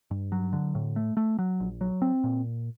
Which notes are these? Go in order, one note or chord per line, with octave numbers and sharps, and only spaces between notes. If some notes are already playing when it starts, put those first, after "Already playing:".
G2
F#3
D3
A2
A3
A3
F#3
A#1
F#3
C4
A#2